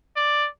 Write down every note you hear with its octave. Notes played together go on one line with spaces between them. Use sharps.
D5